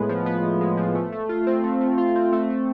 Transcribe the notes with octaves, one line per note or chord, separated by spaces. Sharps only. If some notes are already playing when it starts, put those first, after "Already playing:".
Already playing: A2 G#3 B3
F3
B3
A2
G#3
F3
A3
A3
F4
C4
A3
A3
F4
C4
A3
A3